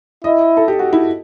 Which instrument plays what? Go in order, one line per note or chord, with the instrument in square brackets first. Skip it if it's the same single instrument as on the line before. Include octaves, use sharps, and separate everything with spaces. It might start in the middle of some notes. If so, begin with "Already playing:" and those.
[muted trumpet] E4 [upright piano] D#5
[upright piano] A4
G4
F#4
E4